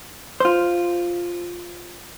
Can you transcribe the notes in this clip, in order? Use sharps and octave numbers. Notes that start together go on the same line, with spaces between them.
F4 C5